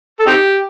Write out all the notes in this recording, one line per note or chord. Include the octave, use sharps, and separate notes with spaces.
A4
C4 D#4 G4